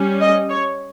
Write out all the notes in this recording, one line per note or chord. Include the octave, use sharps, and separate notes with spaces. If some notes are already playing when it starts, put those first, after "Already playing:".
Already playing: G3 C#4
D#5
C#5